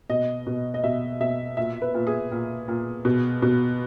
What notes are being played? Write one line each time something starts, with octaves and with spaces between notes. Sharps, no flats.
B2 D#5
B2
D#5
B2 E5
B2 E5
A#2 E5
B4
A#2
G#4
A#2
A#2
B2
B2